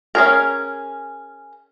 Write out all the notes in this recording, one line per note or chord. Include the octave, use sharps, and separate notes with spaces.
C#4 G#4 A#4